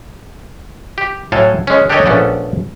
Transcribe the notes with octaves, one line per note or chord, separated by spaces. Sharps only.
G4
A2 F#3 A4 F5 G#5
G#3 C#4
D4 G4 A4 A#4 C#5 D#5
A#1 A3 B3 C#4 A4 D5